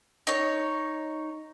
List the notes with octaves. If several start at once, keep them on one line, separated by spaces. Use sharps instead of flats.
D#4 C#5